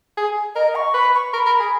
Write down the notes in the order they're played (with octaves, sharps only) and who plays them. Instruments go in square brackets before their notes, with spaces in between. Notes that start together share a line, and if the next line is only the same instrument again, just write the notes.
[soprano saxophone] G#4
[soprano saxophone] A#4 [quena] D#5
[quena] C#6
[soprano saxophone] B4 [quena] B5
[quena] C#6
[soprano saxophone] A#4 [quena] B5
[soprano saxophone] A#4
G#4